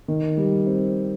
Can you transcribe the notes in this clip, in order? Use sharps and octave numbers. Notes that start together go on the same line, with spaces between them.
D#3
G3
C4